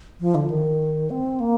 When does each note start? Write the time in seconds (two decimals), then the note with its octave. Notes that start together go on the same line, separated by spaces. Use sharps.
0.20 F3
0.35 D3
0.50 D#3
1.10 C4
1.40 A#3